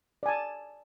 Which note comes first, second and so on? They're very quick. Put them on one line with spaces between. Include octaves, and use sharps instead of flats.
D5 G#5 A5